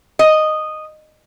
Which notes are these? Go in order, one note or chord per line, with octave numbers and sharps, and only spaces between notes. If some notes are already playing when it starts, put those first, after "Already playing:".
D#5